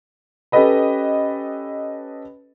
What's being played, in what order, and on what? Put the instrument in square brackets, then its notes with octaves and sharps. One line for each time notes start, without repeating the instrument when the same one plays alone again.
[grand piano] C#4 G4 A4 B4 D#5 B5